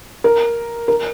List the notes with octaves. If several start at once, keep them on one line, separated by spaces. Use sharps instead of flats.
A#4
A#4